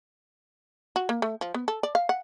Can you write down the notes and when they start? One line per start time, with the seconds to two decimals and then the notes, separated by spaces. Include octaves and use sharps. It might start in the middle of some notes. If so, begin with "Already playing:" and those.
0.96 F#4
1.09 A#3
1.22 A3
1.41 F3
1.54 B3
1.68 A4
1.83 D5
1.95 F5
2.09 F#5